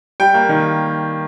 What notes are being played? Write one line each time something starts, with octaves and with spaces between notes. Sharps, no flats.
G3 G5
A#3
D#3